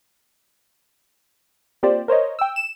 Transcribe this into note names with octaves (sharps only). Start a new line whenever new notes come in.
A#3 C4 F4 G4 C5 D5
A#4 C5 C#5 D#5
G5 E6
E7